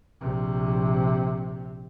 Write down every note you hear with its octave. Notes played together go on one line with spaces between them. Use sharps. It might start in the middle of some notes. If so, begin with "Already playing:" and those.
A#1 C3